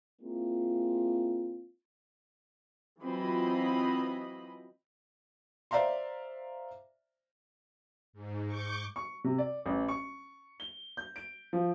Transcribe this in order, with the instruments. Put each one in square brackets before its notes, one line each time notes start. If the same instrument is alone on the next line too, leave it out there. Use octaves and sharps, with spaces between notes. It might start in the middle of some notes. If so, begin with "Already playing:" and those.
[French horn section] G#3 A#3 C4 E4 F4
[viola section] E3 F#3 C4 F4 D#5 B5
[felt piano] C5 D5 E5 F5 A#5 C6
[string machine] G#2
C#6 D6 G6
[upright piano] C#6
C3
D5
A1
C#6
G7
G6
D7
F3